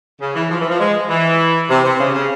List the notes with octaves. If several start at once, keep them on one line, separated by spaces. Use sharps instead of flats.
C#3
E3
F3
E3
F3
G#3
E3
C3
C3
C#3
C#3